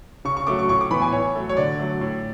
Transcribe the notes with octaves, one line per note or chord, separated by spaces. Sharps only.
C#3 C#6
C#6
F#3 A3 D6
C#6
A2 C#6
D6
E3 B3 B5
G#5
A2 C#5
F#3 A3
C#5
D3 D5
F#3 A3
A2